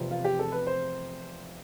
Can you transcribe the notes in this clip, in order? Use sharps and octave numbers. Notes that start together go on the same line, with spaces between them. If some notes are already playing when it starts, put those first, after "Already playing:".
Already playing: F1 E2 C3 F3 C4
F4
G4
A4
B4
C5